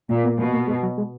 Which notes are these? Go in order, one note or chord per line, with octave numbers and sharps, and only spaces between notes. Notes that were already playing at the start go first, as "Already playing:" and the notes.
A#2 A#3
B3
B2 A#3
A#3
G#3
F#3
G#3